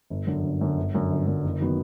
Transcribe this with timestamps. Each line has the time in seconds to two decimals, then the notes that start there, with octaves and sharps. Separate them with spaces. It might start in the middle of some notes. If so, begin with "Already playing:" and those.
0.10 G1
0.27 F#2 D3
0.44 G1
0.61 F#2 D3
0.77 G1
0.95 F#2 D3
1.11 G1
1.27 F#2 D3
1.44 F#1
1.60 D#3 F#3 B3